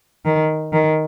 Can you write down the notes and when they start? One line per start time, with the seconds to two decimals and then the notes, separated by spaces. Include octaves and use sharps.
0.25 D#3
0.73 D#3